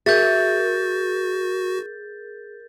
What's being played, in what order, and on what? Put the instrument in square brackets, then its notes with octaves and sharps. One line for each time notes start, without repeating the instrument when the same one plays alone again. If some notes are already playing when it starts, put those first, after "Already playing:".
[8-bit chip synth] F#4 [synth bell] G#4 A#4 [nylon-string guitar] E5 [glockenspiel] G6 A6